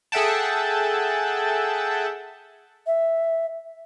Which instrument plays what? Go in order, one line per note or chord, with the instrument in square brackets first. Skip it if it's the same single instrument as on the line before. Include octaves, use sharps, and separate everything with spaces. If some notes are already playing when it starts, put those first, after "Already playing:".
[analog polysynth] G#4 A4 E5 F#5 G5 A5
[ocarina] E5